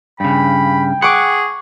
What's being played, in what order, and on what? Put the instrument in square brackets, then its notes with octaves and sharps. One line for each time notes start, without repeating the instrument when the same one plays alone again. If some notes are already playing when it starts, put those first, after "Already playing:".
[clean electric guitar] G2 C#3 [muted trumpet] G5 [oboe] B5
[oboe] G#4 [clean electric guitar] F#5 [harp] C#6 D6